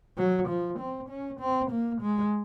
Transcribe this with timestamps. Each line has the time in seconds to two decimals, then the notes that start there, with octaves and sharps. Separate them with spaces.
0.18 F#3
0.48 F3
0.79 C4
1.09 C#4
1.40 C4
1.71 A#3
2.02 G#3